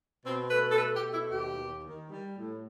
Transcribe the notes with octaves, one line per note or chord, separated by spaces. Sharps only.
B2 C4
A3 B4
A4
A3 B4
G4
B2
E4
D#2 G4
D#2
D#3
G3
A2